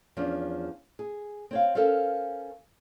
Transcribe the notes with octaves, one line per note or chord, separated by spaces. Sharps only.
E2 F3 C#4 D4
G#4
C4 C#5 F5
C#4 A4 A#4 C5 F5